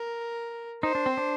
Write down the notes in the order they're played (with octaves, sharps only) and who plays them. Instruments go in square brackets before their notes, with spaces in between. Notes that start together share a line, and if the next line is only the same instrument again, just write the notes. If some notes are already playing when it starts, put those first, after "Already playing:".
Already playing: [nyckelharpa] A#4
[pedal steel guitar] D#4 [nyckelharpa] C5
[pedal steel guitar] D4
C4
D4